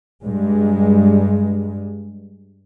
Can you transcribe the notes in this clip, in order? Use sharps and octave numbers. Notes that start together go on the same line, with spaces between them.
G2 G#3